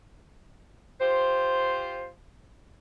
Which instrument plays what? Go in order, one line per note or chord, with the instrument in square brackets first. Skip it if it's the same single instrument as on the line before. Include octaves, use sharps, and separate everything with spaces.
[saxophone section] F4 G4 C5